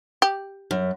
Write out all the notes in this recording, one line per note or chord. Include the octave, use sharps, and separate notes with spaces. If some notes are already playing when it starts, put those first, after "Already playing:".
G4
F#2